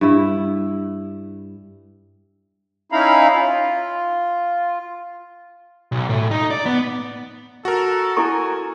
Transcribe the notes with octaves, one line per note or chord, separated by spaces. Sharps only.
G2 E4
C#4 D#4 E4 F5 A#5 B5
F4
B1
A2
D#4
D5
B3
F#4 A4 A#4
E4 A4 G#5 C#6